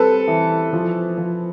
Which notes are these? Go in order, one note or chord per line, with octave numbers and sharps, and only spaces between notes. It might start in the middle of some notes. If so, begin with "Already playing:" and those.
Already playing: G3 C4 A4 B4
E3
F3
F3